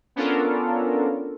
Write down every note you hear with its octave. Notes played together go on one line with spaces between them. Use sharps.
B3 C#4 D4 F4 A4 A#4